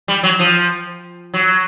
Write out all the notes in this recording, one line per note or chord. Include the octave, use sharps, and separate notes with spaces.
G3
F#3
F3
F#3